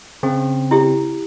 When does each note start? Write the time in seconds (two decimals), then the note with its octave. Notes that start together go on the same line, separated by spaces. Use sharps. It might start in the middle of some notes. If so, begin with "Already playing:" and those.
0.23 C#3 C4
0.71 E4 G4